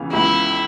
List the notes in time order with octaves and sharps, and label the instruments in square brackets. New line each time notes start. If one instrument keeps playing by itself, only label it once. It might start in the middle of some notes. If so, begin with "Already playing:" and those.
Already playing: [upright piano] C#2 C#3 E3 B3
[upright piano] C#2 [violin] E4